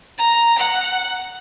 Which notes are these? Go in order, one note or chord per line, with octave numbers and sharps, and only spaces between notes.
A#5
F#5